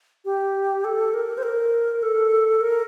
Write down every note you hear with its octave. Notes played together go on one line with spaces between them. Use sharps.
G4
A4
A#4
C5
A#4
A4
A#4